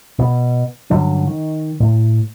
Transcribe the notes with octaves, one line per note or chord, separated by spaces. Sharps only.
B2
G2 D3 F#3 C#4
D#3
A2